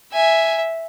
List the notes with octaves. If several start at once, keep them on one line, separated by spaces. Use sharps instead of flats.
E5 G#5